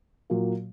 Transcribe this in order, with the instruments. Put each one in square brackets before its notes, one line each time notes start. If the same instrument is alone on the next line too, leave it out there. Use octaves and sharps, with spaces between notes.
[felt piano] A#2 F#3 A#3